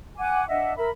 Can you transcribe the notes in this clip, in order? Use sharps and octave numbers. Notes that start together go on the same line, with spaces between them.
F#5 G#5 D6
D4 D#5 E5 F#5
A#4 E5 B5